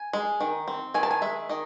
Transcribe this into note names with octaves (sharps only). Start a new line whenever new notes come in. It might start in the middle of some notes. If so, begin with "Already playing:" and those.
Already playing: G#5
G#3
D#3
C4
D#3 G#5
A5
G#5
G#3 E5
D#3 D#5